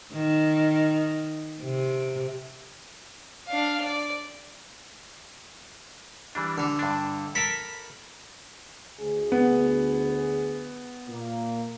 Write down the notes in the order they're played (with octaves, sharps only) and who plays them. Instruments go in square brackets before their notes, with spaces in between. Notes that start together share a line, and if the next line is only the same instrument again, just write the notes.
[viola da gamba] D#3
C3
[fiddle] D4 F5
D5
[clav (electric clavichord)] E3 G3 D4
[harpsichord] D3
[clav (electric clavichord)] G2 D4
[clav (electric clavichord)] A4 A#4 A5 [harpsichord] B5
[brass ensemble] D2 G#4
[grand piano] B3
[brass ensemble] A#2 A#3